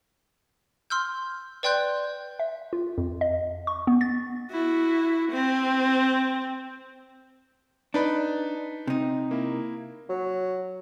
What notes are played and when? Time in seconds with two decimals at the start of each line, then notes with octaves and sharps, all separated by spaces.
0.90 C6 E6 F6 G6
1.63 B4 D5 G5 C6 F#6 G6
2.39 E5
2.73 F4
2.98 F2
3.21 D#5
3.67 C#6
3.87 B3
4.01 A6
4.51 E4 F#4
5.32 C4
7.94 D4 D#4 B4 B5
8.87 C3 D#4
9.31 A#3 E4
10.09 F#3